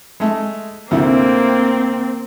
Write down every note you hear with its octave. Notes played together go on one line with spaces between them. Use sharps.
G#3 A3
D2 C3 A#3 C4 E4